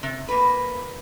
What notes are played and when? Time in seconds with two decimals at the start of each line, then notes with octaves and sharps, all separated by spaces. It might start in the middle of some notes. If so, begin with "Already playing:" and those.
0.03 C3
0.29 A#3 B4